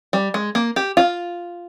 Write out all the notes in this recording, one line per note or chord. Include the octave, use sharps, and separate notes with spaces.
G3
G#3
A#3
G4
F4